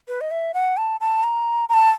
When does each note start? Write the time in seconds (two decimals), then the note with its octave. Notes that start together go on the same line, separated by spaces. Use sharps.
0.08 B4
0.21 D#5
0.31 E5
0.54 F#5
0.77 A5
1.00 A5
1.23 A#5
1.69 A#5
1.74 A5